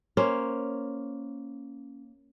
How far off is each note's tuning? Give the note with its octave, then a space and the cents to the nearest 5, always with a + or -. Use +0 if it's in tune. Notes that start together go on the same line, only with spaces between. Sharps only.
A#3 +0 C#4 +0 C5 +0